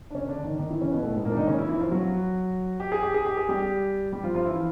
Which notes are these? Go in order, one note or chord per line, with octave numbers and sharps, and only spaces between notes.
D4
C#3 C#4
D3 D4
D#3 D#4
D#3 D#4
E3 E4
C#3 C#4
B2 B3
A2 A3
G#2 G#3
A#2 A#3
D4
D#3 D#4
C#3 C#4
E3 E4
E3 E4
F3 F4
F#3 F#4
G4
G#4
G4
G#4
G4
G#4
G3 G4
G3 G4
F3 F4
F3 F4
E3 E4